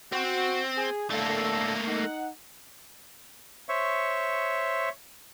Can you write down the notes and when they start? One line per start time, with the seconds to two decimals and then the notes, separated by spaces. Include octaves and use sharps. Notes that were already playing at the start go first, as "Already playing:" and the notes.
0.12 C4 F#4
0.77 G#4
1.10 A2 D3 A3 A#3 A4
1.86 D#4 F#5
3.69 C5 C#5 E5 C#6